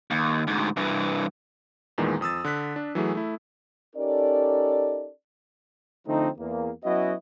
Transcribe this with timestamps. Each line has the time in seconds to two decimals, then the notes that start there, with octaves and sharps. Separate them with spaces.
0.11 D#2
0.47 D2 G#2
0.77 G2 E3
1.98 E2 A#2 D#3 E3 G#3
2.21 F2 D#6 E6 A6
2.44 D3 F#6 B6
2.76 D4
2.95 E3 F#3 A3 G#4
3.15 A3 E4
3.96 C#4 D#4 G4 A4 A#4 D5
6.06 D3 F3 A3 C4 D#4
6.38 E2 A#3
6.84 F#3 B3 C#4 E4 F#4 D#5